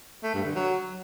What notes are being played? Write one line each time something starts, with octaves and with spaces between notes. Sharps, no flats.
A3
G2
D3
F#3